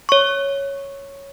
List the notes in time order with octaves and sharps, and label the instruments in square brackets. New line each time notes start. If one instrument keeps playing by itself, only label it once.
[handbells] C#5 C#6